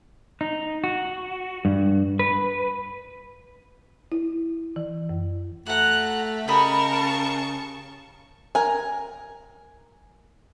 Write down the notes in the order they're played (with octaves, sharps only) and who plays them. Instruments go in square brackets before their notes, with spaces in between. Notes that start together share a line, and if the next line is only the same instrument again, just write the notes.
[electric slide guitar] D#4
F#4
G2
B4
[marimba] E4
E3
F#2
[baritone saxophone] A3 [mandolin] F#4 F#5 [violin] A#5 F#6
[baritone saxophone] C#3 [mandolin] G4 D#5 B5 [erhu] A#4 [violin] A5 C#6
[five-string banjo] A#4 G#5